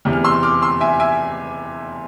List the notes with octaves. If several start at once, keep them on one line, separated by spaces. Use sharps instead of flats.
E2 C3 E3
F6
C6 E6
D6 F6
C6 E6
E5 G#5
E5 G#5